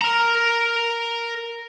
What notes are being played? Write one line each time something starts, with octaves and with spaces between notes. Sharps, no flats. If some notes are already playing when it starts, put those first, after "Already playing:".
A#4 A#5